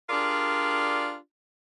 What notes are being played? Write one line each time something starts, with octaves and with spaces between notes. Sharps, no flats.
D4 F4 G4 G#4 A#4 D5